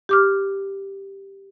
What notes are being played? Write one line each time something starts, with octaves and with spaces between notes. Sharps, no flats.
G4 D6 F6